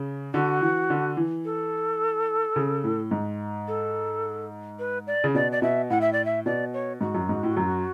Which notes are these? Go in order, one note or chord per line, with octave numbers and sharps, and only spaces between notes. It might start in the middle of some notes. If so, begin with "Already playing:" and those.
Already playing: C#3
D3 F#4
E3
D3
E3
A4
C#3
A2
G#2
A4
B4
D5
C#3
B2 D5
D5
B2 E5
A2 F#5
E5
D5
E5
B2 D5
C#5
G#2 F#4
F#2
G#2
A2
F#2